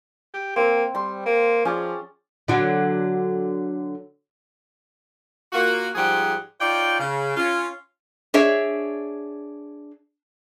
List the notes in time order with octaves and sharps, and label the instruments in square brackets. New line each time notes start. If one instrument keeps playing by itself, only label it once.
[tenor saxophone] G4
[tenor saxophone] A#3 [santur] C4 C5
[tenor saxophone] G3 [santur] C6
[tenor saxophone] A#3
[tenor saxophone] F3 [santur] C#4 G#4 D5
[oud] D3 F#3
[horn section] A#3 F4 F#4
G#2 F3 G3 G4 G#4 F#5
D#4 F4 C#5 D5 G5
C#3
C#4 F4
[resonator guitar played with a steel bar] D4 G#4 C#5 E5